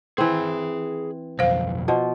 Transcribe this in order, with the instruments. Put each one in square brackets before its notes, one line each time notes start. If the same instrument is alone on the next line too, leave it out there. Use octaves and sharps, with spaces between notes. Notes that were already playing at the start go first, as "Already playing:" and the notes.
[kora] E3 C4 [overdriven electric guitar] G#4 B5
[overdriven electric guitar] B1 F2 [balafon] C5 F5
[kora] B2 F3